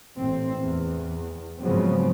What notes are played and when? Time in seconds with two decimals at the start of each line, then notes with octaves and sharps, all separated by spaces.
0.17 A1 C4
0.61 E2
1.60 G#2 C#3 F3 F#3 B3 C4